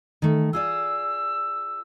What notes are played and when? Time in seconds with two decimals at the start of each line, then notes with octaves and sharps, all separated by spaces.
0.22 D#3 A3
0.53 F4 G#4 D5 E6